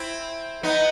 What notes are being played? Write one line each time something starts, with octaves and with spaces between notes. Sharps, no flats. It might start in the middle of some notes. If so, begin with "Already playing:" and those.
Already playing: C4 E4
B3 D#4